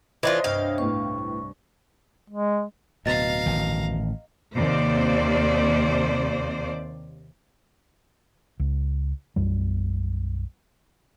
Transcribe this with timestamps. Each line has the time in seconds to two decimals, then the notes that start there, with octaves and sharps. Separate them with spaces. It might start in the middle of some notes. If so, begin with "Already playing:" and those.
0.23 E3 D4 F4 C5 C#5 D#5 E5
0.44 C2 G2 F5 G5
0.78 A2 B3 C#6
2.30 G#3
3.06 D1 B2 D#5 F5 A#5 A6
3.46 A1 D#3
4.55 D#2 C3 C5 D5
8.60 C#2
9.36 B1 F#2 G3